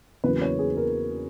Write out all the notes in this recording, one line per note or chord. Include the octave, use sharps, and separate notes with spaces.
E2 C#3 F#3 A#3 B4
C#5
G#4
A#4